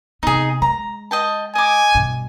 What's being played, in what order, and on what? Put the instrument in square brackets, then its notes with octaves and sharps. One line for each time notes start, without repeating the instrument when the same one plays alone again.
[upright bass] C3 B3 [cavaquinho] D#4 G#4
[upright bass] G#3 [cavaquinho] A#5
[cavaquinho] D#5 G5 A5
[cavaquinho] D#5 D6 [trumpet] G#5
[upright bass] G2 B2